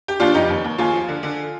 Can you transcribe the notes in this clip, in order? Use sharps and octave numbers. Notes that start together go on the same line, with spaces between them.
G4
D#2 D4 F4
F1 D#4 G4
D#2
D#2
D#2 F4 G#4
F3
D3
D3